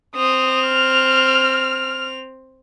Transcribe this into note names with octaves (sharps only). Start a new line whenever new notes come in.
C4 D#6 F7
F6